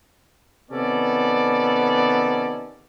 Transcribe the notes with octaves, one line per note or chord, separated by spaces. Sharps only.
C3 D#3 B3 C#4 A4 D5